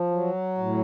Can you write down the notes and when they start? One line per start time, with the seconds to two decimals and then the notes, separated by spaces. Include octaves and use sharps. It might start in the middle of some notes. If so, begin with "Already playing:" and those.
Already playing: F3
0.11 F#3
0.58 A2